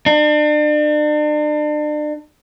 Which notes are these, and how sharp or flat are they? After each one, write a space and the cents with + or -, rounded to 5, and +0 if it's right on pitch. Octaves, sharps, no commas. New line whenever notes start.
D4 +40